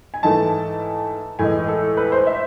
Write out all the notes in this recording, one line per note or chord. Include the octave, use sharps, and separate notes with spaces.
G#5
G#2 E3 A3 A5
A2 E3 G#3 G#5
A4
B4
C5
E5